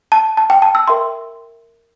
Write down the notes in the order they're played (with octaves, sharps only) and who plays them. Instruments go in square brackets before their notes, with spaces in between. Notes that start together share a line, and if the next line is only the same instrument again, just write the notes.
[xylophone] A5
A5
G5
A5
E6
A#4 E5 G5 C6